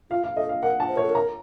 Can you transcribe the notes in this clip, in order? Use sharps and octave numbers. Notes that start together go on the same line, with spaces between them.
F4 F5
F5
A4 D#5
F5
A#4 F#5
A5
C5
A#4 C#5
A4
A#4
A#5